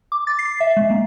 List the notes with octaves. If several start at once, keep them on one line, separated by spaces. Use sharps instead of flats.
D6
A6
C7
E5
G#3
A#3